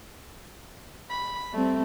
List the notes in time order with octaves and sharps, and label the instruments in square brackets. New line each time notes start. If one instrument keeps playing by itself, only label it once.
[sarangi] B5
[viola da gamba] G3 C4 [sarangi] A3